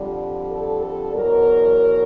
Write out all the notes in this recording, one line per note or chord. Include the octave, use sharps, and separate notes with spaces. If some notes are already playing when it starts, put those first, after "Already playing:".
Already playing: F2 D3 G3
A4
A4
E2 B2 F#3 A#4